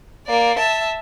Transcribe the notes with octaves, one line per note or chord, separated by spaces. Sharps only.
A#3 D5
E5 A5